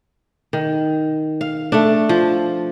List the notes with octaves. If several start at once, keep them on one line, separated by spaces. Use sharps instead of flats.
D#3
F5
A3 D4
F3